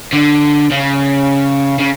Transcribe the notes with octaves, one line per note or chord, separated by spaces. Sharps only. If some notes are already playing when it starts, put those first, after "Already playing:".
D3
C#3
C#3